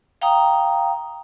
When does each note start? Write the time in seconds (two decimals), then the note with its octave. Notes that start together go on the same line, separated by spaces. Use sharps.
0.22 F5 G5 A#5 D#6